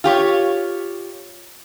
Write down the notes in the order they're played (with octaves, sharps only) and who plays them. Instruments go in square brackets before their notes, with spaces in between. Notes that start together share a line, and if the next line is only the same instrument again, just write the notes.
[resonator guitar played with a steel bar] F4 G4 C#5